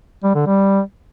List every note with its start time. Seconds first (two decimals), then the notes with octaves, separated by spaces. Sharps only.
0.24 G3
0.35 D3
0.47 G3